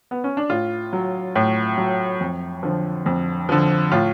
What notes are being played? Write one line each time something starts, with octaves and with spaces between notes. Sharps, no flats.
B3
C#4
D4
A2 F4
F#3
A2
F#3
F2
D3 F3
F2
D3 F3
A2 F4